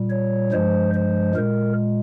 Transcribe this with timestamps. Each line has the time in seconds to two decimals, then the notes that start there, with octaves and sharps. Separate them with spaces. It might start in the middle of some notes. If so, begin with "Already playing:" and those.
Already playing: A#2 G3
0.10 C#5
0.52 G2 F3 G#3 C5
0.94 C5
1.35 A#2 G#3 A#4